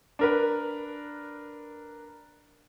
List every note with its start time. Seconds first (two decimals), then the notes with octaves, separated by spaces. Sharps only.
0.19 D4 A#4 B4